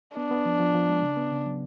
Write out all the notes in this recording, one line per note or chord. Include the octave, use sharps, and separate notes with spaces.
B3 D4
B3
F3
F3
F3
G#3
C#3
B3
C#3
F#3